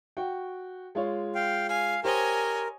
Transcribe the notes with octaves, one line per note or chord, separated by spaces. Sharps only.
F#4 G5
G#3 F4 C#5
F5 G5
F5 G#5
G4 A#4 C5 C#5 D#5 G#5